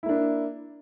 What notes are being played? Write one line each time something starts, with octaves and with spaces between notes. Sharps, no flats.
A#3 D4 E4